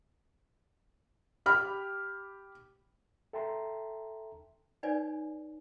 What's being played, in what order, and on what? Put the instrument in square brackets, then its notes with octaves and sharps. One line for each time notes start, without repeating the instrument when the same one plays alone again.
[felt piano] G4 B5 F6
[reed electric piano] A4 E5 G5 A5 A#5 C6
[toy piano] D#4 B4 C#5 D5 G#5